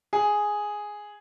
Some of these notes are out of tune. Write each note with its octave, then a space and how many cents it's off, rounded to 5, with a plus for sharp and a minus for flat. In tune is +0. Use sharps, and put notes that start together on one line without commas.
G#4 +0